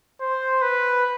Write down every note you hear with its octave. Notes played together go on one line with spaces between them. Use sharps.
C5
B4